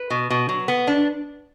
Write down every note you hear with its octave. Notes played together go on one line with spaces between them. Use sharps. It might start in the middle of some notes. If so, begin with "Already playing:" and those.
Already playing: B4
B2
B2
F#3
B3
D4